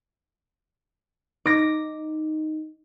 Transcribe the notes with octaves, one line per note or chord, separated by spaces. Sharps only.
D#4 D6 A#6